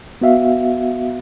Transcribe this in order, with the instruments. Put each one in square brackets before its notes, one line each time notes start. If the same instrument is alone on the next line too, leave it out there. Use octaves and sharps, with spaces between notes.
[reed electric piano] B3 F#4 E5 F5